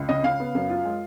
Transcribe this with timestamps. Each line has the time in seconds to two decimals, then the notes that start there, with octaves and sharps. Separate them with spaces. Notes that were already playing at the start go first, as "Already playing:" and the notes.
Already playing: C#2
0.09 C#3 D#5
0.23 C#3 F5
0.40 B3
0.55 F#2
0.70 F4
0.85 G#3